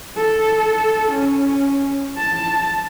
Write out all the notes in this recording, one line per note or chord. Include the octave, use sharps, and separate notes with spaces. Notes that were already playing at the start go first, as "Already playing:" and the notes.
A4
C#4
A5